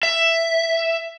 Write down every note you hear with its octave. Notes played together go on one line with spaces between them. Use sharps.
E5